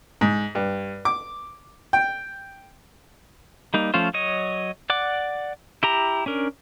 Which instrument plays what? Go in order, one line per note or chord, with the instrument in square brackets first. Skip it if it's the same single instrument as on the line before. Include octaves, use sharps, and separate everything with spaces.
[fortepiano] G#2
G2
D6
G5
[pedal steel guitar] G3 A#3 D#4
F3 A3 C#4 F4 C5
F#3 C#5 D#5
D5 F#5 D6
E4 G4 A#5
C#4 D4 A#4